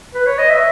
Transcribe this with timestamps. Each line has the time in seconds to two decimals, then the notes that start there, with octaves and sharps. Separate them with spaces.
0.14 B4
0.26 C#5
0.38 D#5
0.50 E5